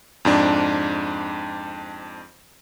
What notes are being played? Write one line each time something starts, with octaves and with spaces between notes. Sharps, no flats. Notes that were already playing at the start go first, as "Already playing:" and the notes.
F2 G#2 D4